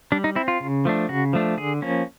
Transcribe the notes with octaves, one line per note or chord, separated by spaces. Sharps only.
G3 D4
D#4
C4 E4
F4
C#3
F3 A3 D4
C#3 F#4
F3 A3 D4
D3 G#4
F3 A#3 C#4